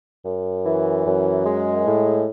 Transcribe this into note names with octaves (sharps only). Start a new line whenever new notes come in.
F#2
E3
F#2
G#3
A2